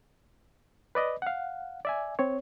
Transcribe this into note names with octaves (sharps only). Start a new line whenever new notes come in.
B4 D5 D#5
F5 F#5
D5 E5 G#5
C4 C#5